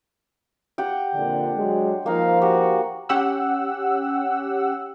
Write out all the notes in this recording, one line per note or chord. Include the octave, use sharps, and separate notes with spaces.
G4 F#5 G5
F2 A#2 D3 D4
F#3 G#3
F3 A#3 D#4 F5
F#4 G4
C#4 G4 F#5 E6